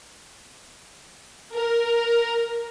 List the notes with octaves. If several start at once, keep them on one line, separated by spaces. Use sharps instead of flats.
A#4